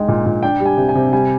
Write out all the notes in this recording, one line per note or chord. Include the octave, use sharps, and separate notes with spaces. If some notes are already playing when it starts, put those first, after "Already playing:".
Already playing: G#3 D#4 G5
A#2
A#2
D4 G5
G3
G#5
C3
G#5
C3
G3 G#5